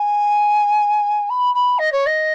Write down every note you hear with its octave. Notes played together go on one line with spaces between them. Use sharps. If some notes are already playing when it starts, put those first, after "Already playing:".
Already playing: G#5
B5
B5
D#5
C#5
D#5